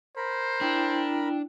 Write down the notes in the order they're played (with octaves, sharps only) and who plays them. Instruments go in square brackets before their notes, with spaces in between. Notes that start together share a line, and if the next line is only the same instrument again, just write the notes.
[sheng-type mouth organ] A#4 B5 [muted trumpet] C5
[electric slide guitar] D4 [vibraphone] E4 G5